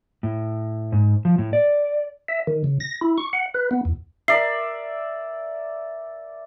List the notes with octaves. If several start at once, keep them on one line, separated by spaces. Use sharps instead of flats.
A2
G#2
F3
A2
D5
E5
D#3
C#3
A#6
E4
C#6
F#5
B4
B3
E2
A#4 D5 E5 C7